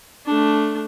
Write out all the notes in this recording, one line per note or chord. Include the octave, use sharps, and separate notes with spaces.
A3 D4